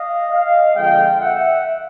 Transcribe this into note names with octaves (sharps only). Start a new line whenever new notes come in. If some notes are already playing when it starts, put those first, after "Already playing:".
Already playing: D#5 F5
D#5 F5
F2 D3 F3 G#3 F5 G5
E5 F#5